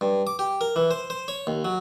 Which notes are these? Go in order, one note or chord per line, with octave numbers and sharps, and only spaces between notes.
G2
D6
G4
A#4
E3
C5
C5
C#5
D#2
F#3